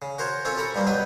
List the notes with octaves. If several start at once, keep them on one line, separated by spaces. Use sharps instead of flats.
C#3
F#4 A#4 C5 C#5
C4 C#4 F4 A4 C#5
G4 A4 A#5 B5 C#6
G2 F3 G3 A#3
B2 F#3 G4 B4 G5